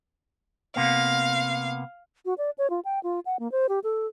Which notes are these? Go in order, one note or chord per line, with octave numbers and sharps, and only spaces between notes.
C3 A#3 B3 F5
F#4
D5
C#5
F4
G5
F4
F#5
A#3
C5
G4
A4